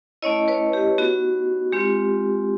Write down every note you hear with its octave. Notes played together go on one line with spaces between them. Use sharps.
A3 C#4 E4 C#5 D#5
B4 C#5
G4
B3 D#4 F#4
G#3 C4 F4 G4